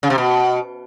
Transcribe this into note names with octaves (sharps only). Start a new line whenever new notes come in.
C#3
C3
B2